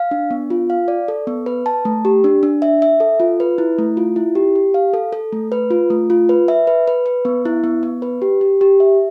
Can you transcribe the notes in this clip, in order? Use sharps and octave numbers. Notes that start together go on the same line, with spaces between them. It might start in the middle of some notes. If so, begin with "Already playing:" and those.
Already playing: F5
D4
B3
F4
F5
D5
A4
B3
B4
A5
A3
G4
D4
D4
E5
E5
A4
F4
B4
E4
A3
F4
E4
G4
G4
F5
A4
A4
A3
B4
F4
A3
F4
B4
E5
B4
B4
B4
B3
E4
B3
B3
B4
G4
G4
G4
E5